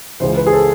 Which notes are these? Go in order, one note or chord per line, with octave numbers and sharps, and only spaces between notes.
C#2 C#3 E3 C5
B4
G#4
A4